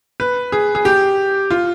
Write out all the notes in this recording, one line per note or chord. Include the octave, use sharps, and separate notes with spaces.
B4
G#4
G#4
G4
F4